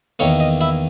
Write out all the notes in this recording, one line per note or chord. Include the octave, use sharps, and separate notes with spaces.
E2 D#3 A#3 C#5
D#5
E4